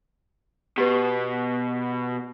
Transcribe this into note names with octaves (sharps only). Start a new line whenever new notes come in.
B2 G4 B4